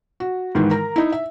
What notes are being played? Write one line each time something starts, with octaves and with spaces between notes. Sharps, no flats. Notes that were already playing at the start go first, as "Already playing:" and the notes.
F#4
G#2 D#3 E3
A#4 A#5
D#4 E4
E5